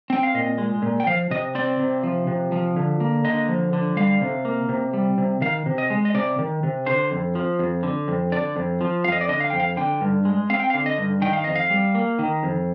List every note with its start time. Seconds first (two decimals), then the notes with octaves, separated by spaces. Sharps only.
0.10 C4 G5
0.23 F5
0.34 A#2 D#5
0.58 G#3
0.82 A#2
1.00 G5
1.06 F3 F5
1.30 C3 D#5
1.55 C4 D5
1.79 C3
2.03 F3
2.27 C3
2.52 F3
2.76 D3
3.00 A#3
3.25 D3 D#5
3.49 F3
3.73 D3
3.97 G3 F5
4.21 C3
4.45 A#3
4.69 C3
4.93 G3
5.18 C3
5.41 D#3 F5
5.66 C3
5.78 D#5
5.90 G#3
6.05 D#5
6.14 C3 D5
6.39 D#3
6.63 C3
6.86 D3 C5
7.11 F2
7.35 F3
7.59 F2
7.83 D3
8.08 F2
8.32 D3 D5
8.56 F2
8.81 F3
9.04 F2 F5
9.12 D#5
9.21 D5
9.29 D3 D#5
9.40 F5
9.50 F2 G5
9.60 F5
9.77 D3 G5
10.01 G2
10.25 G#3
10.50 C4 F5
10.60 G5
10.70 F5
10.74 D3
10.86 D#5
10.98 G2
11.22 D#3 G5
11.33 F5
11.44 F2 D#5
11.55 F5
11.70 G3
11.95 A#3
12.19 D#3
12.43 F2